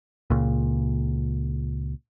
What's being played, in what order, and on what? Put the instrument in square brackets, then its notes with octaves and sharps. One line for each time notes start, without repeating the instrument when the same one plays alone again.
[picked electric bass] C#2 A#2